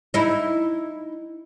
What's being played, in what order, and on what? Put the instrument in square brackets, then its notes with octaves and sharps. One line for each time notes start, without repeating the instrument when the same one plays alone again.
[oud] D#4 E4